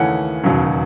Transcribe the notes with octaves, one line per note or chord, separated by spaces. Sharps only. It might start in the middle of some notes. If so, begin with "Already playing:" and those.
Already playing: D#2 C#3 E3 A3 C#4 F#5
E1 D#2 C#3 F#3